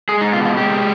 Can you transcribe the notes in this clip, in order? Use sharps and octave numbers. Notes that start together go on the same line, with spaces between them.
G#3 G#4
D#4
B2 F4
F4
G#3 G4